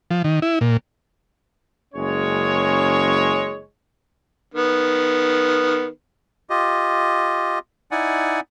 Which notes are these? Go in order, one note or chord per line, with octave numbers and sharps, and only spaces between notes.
F3
D#3
E4
A#2
F#1 G#3 C#4 C#5
D#3 B3
F4 G4 D#5
D#4 E4 D5 F#5 G#5